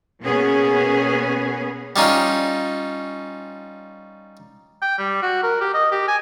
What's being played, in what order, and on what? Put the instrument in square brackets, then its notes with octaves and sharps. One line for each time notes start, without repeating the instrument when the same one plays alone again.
[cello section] B2 A#3 B3 C#4 G#4
[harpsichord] G3 C#4 D#4 F4
[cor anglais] G5
G3
F#4
A#4
G4
D#5
G4
G#5